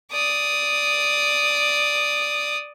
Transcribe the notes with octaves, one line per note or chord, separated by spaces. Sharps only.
D5 D#6